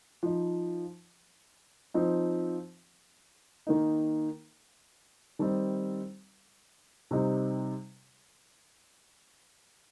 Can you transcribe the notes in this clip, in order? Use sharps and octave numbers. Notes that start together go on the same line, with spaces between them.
F3 D#4
F3 C4 D#4
D#3 A#3 D#4
D#3 G3 C4 D#4
C3 G3 C4 D#4